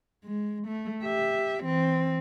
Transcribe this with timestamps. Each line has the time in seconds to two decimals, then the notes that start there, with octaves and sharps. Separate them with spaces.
0.25 G#3
0.67 A3
1.03 G4 E5
1.64 E3 C4